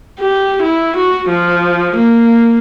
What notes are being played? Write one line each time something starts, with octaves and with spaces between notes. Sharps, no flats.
G4
E4
F#4
F3
A#3